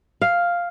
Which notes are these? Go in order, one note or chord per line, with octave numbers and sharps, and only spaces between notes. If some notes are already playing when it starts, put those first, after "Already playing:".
F5